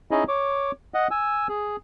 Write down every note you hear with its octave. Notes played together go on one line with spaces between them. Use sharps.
C#4 D#4 E4 G#4 D#5
C#5 D6
D#5 F#5
G#5 E6
G#4